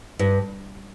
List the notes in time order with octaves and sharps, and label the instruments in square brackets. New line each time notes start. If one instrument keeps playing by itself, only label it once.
[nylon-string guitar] G2